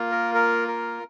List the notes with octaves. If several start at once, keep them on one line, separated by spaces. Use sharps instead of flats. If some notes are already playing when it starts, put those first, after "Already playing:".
Already playing: A#3 F4
A#4
A#4
A#4